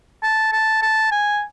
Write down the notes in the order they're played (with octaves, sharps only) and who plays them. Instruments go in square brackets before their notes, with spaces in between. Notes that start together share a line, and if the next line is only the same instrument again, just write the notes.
[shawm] A5
A5
A5
G#5